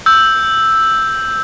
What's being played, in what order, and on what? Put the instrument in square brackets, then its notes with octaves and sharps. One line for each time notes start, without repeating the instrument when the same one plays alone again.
[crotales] E6 G6